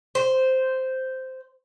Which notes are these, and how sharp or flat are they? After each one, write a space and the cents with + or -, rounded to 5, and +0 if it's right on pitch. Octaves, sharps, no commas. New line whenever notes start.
C5 -5